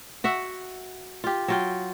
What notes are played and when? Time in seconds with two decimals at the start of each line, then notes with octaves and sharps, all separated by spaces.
0.24 F#4 E5 F#5
1.24 F4 G4
1.48 F#3 F4 G5